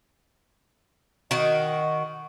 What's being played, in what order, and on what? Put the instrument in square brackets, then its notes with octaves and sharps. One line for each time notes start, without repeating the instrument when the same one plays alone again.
[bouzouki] D#3 F#4 [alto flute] D#5